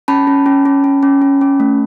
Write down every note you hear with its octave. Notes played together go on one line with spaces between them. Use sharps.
C#4 A5 B5
C#4
C#4
C#4
C#4
C#4
C#4
C#4
A3